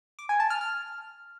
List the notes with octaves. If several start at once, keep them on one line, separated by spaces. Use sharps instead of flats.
D6
G#5
A5
F6
F6